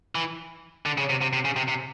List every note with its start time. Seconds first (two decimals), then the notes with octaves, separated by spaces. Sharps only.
0.15 E3
0.86 D3
0.98 C#3
1.10 C3
1.21 C3
1.33 C3
1.45 C#3
1.56 C3
1.68 C3